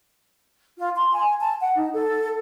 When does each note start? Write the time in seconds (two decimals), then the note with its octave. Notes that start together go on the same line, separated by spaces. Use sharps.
0.79 F4
0.96 C6
1.13 G#5
1.40 A5
1.61 F#5
1.75 D#4
1.94 A4